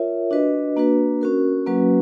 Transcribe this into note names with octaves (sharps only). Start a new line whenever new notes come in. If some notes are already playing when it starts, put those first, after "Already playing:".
Already playing: F4 A#4 C#5 E5
D4 F#4 B4 D#5
A#3 D4 F#4 B4
C#4 F#4 A#4
F#3 A#3 C#4 F#4 B4